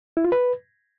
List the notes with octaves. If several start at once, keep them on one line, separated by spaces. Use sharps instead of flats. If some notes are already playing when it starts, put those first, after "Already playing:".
E4
F4
B4